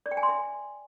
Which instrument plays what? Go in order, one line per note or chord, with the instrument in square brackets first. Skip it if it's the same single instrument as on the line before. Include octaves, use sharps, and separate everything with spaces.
[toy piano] D5
G5
G#5
C6
E5